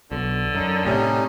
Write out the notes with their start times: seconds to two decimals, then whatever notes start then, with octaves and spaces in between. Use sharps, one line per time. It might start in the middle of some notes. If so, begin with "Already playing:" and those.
0.11 B1 D3
0.55 F#2 D#4
0.85 A2 C3 G3 C#4 D#4